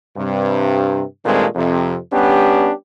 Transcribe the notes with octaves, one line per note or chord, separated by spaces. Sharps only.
G2 C3
G2 A#2 D#3 G#3 A3 C4
F2 C3
G3 B3 C#4 D4 G4